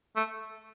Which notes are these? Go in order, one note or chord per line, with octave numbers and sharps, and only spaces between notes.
A3